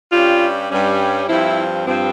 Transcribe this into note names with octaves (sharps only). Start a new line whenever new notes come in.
G2 G3 C#4 F4
G2 G3 C#4
G2 F3 C4 E4
G2 F3 C4